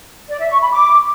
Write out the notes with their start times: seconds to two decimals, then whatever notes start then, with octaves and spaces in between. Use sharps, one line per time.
0.29 D5
0.40 E5
0.51 C#6
0.62 B5
0.72 D6